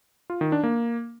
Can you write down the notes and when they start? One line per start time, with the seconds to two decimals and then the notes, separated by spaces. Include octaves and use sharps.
0.30 F4
0.41 D#3
0.52 D4
0.63 A#3